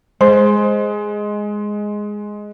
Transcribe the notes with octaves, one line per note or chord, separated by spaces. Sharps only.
G#3 C5